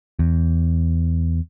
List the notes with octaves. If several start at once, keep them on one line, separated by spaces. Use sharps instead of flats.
E2